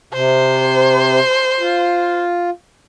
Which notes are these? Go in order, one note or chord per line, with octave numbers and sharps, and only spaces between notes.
C3 C5
F4